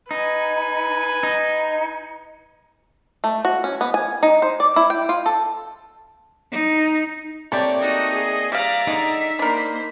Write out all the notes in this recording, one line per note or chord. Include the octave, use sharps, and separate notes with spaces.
D#4 B4 G#5
D#4
A3
F#4
C#4
B3
G#5
D#4
C5
D5
E4
G5
F4
A4
D#4
A3 A#3 C4 G4 A4 C#5 D5
D#4 F#4 D#5
G#4
G3 D5 E5 F5 A#5
D3 G#3 D#4
A#3 D4 A#4 C5 B5